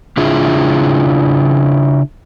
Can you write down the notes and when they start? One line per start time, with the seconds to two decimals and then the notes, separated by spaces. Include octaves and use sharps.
0.17 C#3 D4 E4 F4 G#4